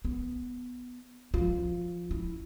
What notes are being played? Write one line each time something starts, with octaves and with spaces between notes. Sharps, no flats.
B3
F3 F4
E4